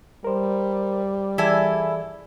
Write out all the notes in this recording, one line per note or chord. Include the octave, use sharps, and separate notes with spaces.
G3 A#4 C5
E3 E4 G#4 A4 D5 G#5